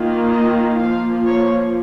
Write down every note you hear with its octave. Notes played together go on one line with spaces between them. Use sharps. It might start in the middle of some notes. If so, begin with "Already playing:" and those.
Already playing: D#3 A#3 F4
D#5
F3 A#3 F4 F5
C#5